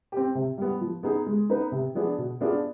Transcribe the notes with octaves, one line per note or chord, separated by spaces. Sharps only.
C4 G4
C3
G3 B3
F3
B3 D#4 G#4
G#3
B3 D#4 B4
C3
F3 B3 D4 G#4
B2
B3 D4 F4 G#4